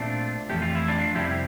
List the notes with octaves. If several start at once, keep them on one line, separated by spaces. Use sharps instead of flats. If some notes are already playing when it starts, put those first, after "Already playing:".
Already playing: A#2 A3 C4 D4 F4
F2 E3 A3 G4
F4
E4
D4 F4
F2 C3 G3 C4 E4 G4